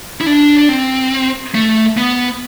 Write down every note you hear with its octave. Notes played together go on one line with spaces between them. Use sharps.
E4
D4
D4
C4
A3
B3